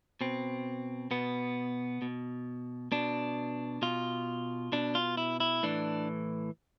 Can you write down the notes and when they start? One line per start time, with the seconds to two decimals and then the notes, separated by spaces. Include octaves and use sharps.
0.21 B2 C4
1.11 B2 B3
2.02 B2
2.92 B2 D4
3.82 B2 F4
4.72 B2 D4
4.95 F4
5.17 E4
5.40 E4
5.63 A2 E3 D4